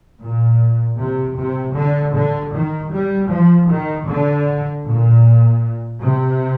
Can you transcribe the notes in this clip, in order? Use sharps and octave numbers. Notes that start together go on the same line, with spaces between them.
A#2
C3
C3
D3
D3
D#3
G3
F3
D#3
D3
A#2
C3